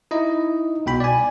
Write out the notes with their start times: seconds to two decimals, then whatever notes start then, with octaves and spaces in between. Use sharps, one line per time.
0.11 D#4 E4 D#5
0.86 C2 B2 G5 B5
1.00 D5 G#5